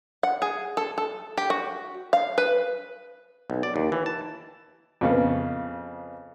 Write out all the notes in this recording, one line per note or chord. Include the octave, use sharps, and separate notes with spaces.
F#5
G#4
A4
A4
G4
F#4
F5
B4
B1
D5
D#2
E3
A5
F2 C#3 B3